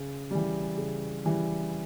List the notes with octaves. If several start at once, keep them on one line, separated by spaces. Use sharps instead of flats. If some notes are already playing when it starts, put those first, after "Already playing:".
Already playing: C#3
E3 G3
C#3
E3 G3